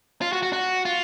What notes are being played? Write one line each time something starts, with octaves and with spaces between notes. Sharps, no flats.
F4
F#4
F#4
F#4
F4